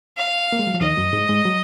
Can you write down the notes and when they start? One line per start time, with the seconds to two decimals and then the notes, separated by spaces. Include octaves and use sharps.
0.17 F5
0.52 A#3
0.59 G#3
0.67 F#3
0.74 F3
0.81 D#2 D#3 D#5
0.97 F#2 F#3
1.13 G#2 G#3
1.29 G#2 G#3
1.45 F#3